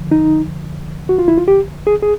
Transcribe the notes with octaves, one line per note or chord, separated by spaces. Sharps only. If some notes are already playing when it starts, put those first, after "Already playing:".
Already playing: F2 D3 F3
D#4
F#4
F4
E4
F4
G4
G#4
G#4